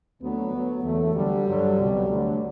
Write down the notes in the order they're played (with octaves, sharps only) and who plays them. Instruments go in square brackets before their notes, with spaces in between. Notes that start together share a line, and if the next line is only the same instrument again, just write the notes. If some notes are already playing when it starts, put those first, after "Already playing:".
[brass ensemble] D2 D3 F#3 B3
D2 D3 F#3
E2 D3 F#3 A3
D2 D3 F#3 G3
G2 D3 F#3
C2 B2 F#3
D2 D3 F#3